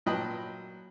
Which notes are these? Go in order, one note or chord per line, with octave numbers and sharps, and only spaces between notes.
A#2 F#3 D#5 G5 A5 B5